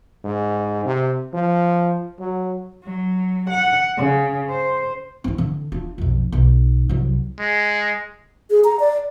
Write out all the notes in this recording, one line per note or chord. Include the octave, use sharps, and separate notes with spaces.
G#2
C3
F3
F#3
F#3
F#5
C#3
C5
C4 E4
D3
D4 F4
B1 F2
B1
C2 F#3
G#3
G#4
A#5
D5